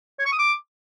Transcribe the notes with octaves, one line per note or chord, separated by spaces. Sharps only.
C#5
C#6
D#6
D6